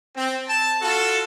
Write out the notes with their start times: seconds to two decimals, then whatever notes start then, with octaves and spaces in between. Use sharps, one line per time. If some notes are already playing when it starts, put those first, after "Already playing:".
0.17 C4
0.49 A5
0.82 F4 F#4 A4